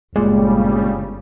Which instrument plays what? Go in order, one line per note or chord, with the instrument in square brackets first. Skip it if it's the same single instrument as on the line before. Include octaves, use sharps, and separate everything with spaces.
[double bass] G1 [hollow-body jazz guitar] A#2 [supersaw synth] C#3 G3 [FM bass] G#3